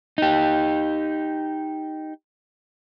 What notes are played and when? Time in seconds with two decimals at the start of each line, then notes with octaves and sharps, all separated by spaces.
0.18 D#4 G4